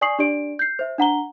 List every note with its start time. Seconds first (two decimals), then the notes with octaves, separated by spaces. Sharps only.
0.01 D5 G#5 C#6 D#6 C7 F#7
0.19 D4 G4 D5 D7
0.59 G6 C7
0.79 C5 E5
0.98 D4 F#5 A#5 G7